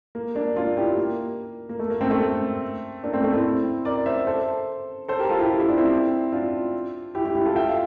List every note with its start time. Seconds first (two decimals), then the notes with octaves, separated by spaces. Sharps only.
0.15 A#3
0.35 A#3 D4
0.56 D4 F4
0.77 E4 G4
0.97 A#3
1.69 A#3
1.79 A3
1.90 A#3
2.01 A3 C4
2.11 A3 C4
3.04 A#3 D4
3.13 A3 C4
3.23 A3 C4
3.34 C4 E4
3.85 A#4 D5
4.06 C5 E5
4.27 A4 C5
5.08 A4 C5
5.19 G4 A#4
5.29 F4 A4
5.39 E4 G4
5.50 F4
5.60 E4
5.69 D4
5.78 C4 E4
6.32 D4 F4
7.15 E4 G4
7.25 E4 G4
7.35 E4 G4
7.45 F4 A4
7.56 E5 G5
7.68 F5